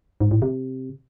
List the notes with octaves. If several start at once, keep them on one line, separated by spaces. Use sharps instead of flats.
G#2
A2
C3